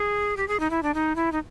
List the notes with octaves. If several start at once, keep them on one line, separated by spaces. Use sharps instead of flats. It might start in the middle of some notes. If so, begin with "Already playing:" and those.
Already playing: G#4
G4
G#4
D#4
E4
D4
D#4
E4
D#4